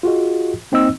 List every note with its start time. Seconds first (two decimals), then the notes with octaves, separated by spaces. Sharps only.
0.03 F4 F#4 G#4 D#5
0.72 A#3 C4 D#4 D#5 E6